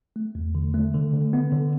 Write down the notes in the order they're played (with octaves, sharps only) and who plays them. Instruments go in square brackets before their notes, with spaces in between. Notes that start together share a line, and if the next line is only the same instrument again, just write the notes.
[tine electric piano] A3
E2
D3
A3
D3
D3
B3
D3